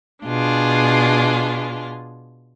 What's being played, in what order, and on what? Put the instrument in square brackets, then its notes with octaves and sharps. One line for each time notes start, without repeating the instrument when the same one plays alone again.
[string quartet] B2 D4 F4 G#4